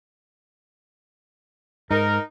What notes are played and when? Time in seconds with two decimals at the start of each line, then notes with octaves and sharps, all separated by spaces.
1.91 G#2 D#4 A#4